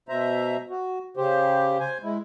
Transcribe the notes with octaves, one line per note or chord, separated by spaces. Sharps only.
B2 C5 E5 A#5
F#4
C#3 G4 C5
C5 G#5
G#3 E4